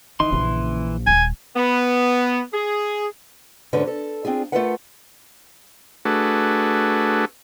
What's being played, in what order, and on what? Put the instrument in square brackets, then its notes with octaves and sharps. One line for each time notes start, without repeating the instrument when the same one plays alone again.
[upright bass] D#3 [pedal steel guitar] E3 C6 [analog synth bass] D#4
[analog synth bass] A#1 [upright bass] C#3
[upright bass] D#1 [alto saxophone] G#5
[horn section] B3
G#4
[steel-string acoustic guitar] D2 G#2 D3 C#4 B4
A4
C4 D4 F4 G#4
A3 C4 F4 A#4 B4 F#5
[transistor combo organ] A3 D4 F#4 G#4 A4 B4